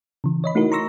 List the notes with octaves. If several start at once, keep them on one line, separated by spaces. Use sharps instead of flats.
C#3 E3
C#5 D#5 B5
A3 D#4 E4 F#4 A#4
A#5 C6 C#6 E6 A#6